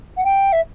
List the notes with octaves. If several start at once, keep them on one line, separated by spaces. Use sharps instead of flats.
F#5
G5
E5